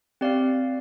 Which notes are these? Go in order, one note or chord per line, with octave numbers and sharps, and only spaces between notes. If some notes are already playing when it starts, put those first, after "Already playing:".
C4 G4 D5 F5